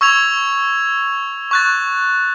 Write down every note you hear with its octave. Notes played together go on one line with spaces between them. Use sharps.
C#6 E6 G#6 F7
C#6 F#6 A6